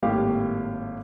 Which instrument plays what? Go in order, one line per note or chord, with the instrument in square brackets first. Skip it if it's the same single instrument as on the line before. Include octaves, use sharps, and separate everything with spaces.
[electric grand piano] G#1 A2 A#3 G4 F5